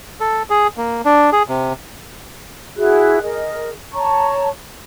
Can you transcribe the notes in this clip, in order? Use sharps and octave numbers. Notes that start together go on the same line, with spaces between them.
A4
G#4
A#3
D4
G#4
C3
E4 F#4 G#4 F#6
G#4 A#4 D#5
C#5 A5 A#5 C#6